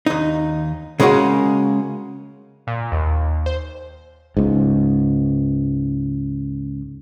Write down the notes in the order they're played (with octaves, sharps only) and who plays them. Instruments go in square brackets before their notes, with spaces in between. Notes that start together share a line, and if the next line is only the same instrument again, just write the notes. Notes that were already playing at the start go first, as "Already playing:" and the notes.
[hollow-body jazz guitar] D#2 D#4
C#3 G#3 A#3 C#4 F#4
[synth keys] A#2
D#2
C5
[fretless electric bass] C#2 G#2